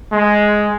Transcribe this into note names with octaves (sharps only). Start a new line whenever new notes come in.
G#3